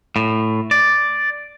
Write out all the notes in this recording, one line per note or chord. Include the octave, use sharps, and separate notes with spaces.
A2
D5